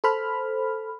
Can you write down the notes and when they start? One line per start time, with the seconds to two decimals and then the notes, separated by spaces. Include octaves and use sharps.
0.04 A4 C5 B5 F6